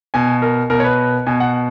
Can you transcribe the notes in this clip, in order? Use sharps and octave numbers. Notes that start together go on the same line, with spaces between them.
B2 G#5
A#4
B2 A#4
C#5
B4
B2 G#5
F#5